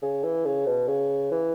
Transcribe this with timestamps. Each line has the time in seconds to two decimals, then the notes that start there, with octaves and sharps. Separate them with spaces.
0.02 C#3
0.24 E3
0.46 C#3
0.66 B2
0.88 C#3
1.31 E3